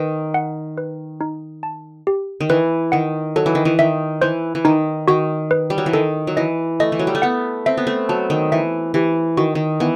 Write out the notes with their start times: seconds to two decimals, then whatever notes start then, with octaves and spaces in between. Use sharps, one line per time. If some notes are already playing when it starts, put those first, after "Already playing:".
Already playing: D#3 B4
0.34 F#5
0.78 B4
1.21 D#4
1.63 A5
2.07 G4
2.41 D#3
2.49 E3 B4
2.92 D#3 F#5
3.36 F#3 A4
3.46 E3
3.55 D#3
3.65 E3
3.79 D#3 E5
4.22 E3 C5
4.55 E3
4.65 D#3 D#4
5.08 D#3 F#4
5.51 B4
5.70 G3
5.78 F#3
5.86 E3
5.93 D#3 A4
6.27 F#3
6.37 E3 D#5
6.80 A3 D#5
6.92 E3
6.99 F#3
7.07 G3
7.15 A3
7.22 B3 F#5
7.66 C4 E5
7.77 B3
7.87 A3
8.09 F#3 A5
8.30 D#3
8.52 E3 E5
8.94 E3 G4
9.37 D#3 F#4
9.55 D#3
9.80 E3 B3